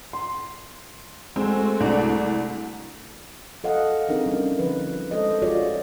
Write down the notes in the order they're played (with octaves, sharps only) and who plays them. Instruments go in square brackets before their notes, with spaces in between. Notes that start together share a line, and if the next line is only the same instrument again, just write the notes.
[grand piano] C6
[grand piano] G#3 [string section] A3 F#4 [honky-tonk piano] C4
[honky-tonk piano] C2 D4 D5
[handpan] A4 D#5 F5 F#5
C4 D4 D#4 G#4 A#4
G3 C#4 E4
D3 F3 B4
G#3 A4 C5 D#5
F4 F#4 G#4 C#5 D5